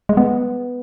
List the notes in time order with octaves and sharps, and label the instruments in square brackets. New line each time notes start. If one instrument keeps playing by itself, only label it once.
[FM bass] G#3
B3